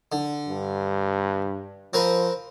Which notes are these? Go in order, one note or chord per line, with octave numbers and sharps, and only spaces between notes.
D3
G2
F3 C4 A#4 B4